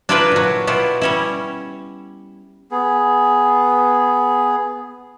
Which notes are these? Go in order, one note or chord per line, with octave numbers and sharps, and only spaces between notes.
D4 E4 F4 G4 A#4 B4
A#2 F#3
B2 B3 E4 F4 G4
G3 C#4 E4
B3 G#4